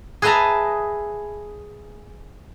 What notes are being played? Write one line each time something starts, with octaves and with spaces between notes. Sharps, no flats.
G#4 B4 D#5 E5 A5 A#5